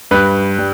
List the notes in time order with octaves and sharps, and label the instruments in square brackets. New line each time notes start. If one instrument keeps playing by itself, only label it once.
[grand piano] G2 G3 B4
G3